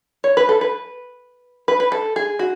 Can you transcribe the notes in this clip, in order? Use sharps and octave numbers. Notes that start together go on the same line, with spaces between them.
C#5
B4
A4
B4
B4
B4
A4
G#4
F#4